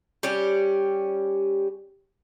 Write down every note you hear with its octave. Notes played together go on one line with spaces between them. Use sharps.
G3 C#4 G4